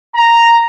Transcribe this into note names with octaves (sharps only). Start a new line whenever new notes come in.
A#5